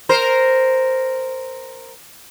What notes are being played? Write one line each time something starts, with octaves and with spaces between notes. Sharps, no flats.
A#4 C5